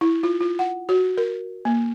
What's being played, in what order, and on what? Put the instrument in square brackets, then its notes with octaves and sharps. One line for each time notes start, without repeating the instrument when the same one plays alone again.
[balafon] E4
F4
F4
F#5
F#4
A#4
A#3